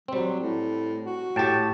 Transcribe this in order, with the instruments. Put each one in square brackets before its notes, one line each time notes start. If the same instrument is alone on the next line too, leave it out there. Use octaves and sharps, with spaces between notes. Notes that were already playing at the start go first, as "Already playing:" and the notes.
[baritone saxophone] F#3 [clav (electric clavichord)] G3 C4
[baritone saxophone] A2
F#4
[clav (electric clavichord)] A2 G4 [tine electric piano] G5 A5 C#6